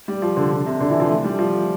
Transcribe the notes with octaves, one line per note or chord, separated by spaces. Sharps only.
G3
F3
D3
D3
C3
D3
E3
F3
A3
G3
F3